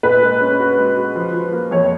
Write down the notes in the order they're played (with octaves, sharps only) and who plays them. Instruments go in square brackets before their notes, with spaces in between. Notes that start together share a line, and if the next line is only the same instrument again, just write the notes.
[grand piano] A#2 [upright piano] B4
[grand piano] G#3
C#4
F#4
G#3
F#4
F3
F3
A#3
[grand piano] F2 [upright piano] C#5